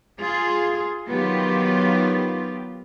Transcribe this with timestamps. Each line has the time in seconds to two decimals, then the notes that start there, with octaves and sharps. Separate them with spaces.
0.20 F4 G#4
1.09 D#3 F#3 B3 F4 G4